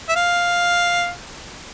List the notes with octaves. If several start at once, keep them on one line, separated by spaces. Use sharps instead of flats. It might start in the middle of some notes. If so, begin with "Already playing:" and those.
E5
F5